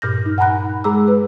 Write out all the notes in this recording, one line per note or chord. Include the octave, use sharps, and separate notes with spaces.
G2 A#2 F6 G6 A#6
D#4
F#5 G#5 A#5 B5 F#6
G#3 G#4 A#5 D6 E6
B4